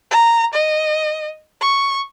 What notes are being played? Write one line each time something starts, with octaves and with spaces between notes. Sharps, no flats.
A#5
D#5
C#6